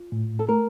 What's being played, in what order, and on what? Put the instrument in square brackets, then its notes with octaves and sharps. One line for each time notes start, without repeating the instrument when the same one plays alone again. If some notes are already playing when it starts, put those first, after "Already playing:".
Already playing: [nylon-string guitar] F4
[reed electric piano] A2
[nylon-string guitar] A4
[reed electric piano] A3 [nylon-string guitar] A#4